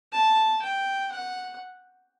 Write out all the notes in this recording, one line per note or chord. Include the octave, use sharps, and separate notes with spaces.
A5
G5
F#5